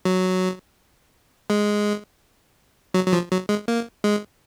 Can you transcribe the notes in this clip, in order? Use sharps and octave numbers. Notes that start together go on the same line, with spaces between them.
F#3
G#3
F#3
F#3
F3
F#3
G#3
A#3
G#3